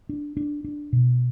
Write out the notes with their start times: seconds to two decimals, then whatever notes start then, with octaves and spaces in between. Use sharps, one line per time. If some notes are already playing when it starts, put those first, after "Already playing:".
0.09 D4
0.37 D4
0.64 D4
0.93 B2